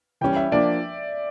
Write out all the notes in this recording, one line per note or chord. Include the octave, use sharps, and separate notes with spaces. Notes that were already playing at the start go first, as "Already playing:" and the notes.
E3 G3 C#4 G5
E5
F3 A#3 D4 D5